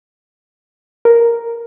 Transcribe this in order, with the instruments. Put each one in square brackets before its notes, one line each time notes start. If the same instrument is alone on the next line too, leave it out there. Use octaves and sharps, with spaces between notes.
[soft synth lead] A#4